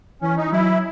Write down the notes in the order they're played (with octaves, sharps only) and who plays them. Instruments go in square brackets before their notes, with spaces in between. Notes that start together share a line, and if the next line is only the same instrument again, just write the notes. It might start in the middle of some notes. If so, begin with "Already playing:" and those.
[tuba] E3 [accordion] C#4
[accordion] D#4
[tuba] F#3 [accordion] E4